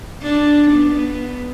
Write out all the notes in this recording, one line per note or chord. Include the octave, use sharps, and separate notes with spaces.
D4
B3